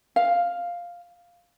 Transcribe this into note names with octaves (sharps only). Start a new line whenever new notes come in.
F5